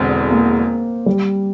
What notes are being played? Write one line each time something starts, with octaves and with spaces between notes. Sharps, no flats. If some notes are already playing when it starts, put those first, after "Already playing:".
Already playing: E1 E2 D3 C4
A#3
G3